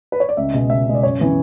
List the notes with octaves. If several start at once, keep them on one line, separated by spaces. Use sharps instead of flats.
B4
C#5
D5
C#2 E5
B2 G#3
C#2 E5
B2 G#3
D5
F#2 C#5
C#3 E3 B3